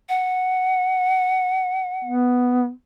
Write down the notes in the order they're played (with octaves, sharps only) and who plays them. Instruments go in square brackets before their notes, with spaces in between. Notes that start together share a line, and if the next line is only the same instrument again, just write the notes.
[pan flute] F#5
[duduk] B3